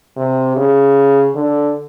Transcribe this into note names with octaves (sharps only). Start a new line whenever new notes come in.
C3
C#3
D3